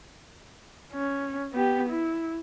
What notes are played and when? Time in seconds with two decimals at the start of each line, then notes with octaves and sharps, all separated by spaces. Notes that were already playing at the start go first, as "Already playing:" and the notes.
0.92 C#4
1.53 B3 G4
1.89 E4